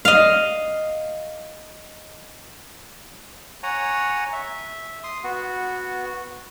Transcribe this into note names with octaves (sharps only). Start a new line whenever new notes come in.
D#5 F5
C#5 F#5 G#5 A#5
E5
C6 D#6
B3 F#4